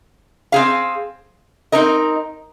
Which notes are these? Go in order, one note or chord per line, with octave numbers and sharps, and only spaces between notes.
C4 G#4 F5
C4 D#4 A#4 D#5